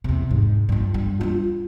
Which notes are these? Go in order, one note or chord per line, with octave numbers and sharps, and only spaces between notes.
E2 C3
G#2
G1 G2
G2
D4 F4